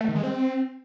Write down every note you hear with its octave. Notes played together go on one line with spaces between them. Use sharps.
A3
D#3
G#3
C4